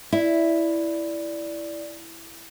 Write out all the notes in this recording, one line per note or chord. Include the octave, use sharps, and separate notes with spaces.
E4 D5